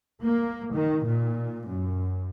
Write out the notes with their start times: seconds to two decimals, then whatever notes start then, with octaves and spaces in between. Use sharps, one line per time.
0.22 A#3
0.73 D#3
1.04 A#2
1.68 F#2